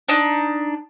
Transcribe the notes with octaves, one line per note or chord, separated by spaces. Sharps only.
D4 D#4